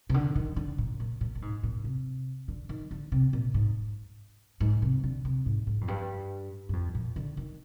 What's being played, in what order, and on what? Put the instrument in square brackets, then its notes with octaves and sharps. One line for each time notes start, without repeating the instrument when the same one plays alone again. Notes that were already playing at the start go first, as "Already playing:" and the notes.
[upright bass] C3
D3
D#3
D3
A#2
A#2
A#2
A#2
G#2
A#2
C3
D3
D#3
D3
C3
A#2
G#2
G#2
C3
D3
C3
G#2
G#2
F2
G2
G2
F2
A#2
D3
D#3